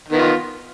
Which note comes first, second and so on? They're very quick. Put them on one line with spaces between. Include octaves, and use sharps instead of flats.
D#3 B3 F4